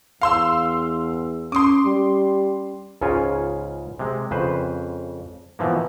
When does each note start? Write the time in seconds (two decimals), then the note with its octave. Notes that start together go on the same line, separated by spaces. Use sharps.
0.21 E2 F5 C6 E6
1.52 C#4 C6 D6 D#6
1.85 G3
3.01 C#2 G#2 C#3 C#4 F4 G#5
3.99 C3 G#3
4.31 F2 C#3 B4 C5
5.59 B2 E3 F3 A#3